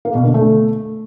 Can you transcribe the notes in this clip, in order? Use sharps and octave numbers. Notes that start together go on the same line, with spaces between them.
A#3
B2
D3
A3